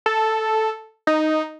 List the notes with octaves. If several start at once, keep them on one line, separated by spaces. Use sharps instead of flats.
A4
D#4